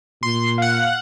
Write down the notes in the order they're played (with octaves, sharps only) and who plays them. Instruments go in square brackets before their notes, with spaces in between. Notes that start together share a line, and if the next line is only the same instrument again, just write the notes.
[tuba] A#2 [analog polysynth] C6
[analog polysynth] F5 F#5